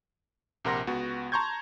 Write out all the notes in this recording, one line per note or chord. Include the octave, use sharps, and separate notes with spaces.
A#1 C3 A#4 F#5 C6 A#6
C#2 B3 F#4
A5 A#5 C6 C#6 G6 G#6